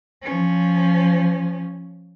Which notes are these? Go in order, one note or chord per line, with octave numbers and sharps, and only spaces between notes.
F3 C#4